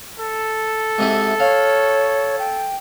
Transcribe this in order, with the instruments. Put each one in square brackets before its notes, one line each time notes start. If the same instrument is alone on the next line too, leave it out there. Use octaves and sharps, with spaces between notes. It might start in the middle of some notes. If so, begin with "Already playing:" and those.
[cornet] A4
[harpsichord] G#2 C3 E4
[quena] C#5 [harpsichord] F5
[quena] G5